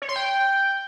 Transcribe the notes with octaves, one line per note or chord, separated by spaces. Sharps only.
C#5
C6
G5